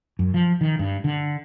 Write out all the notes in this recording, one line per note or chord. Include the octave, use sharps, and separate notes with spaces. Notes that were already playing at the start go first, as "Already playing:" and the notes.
F#2
F3
D#3
G2
D3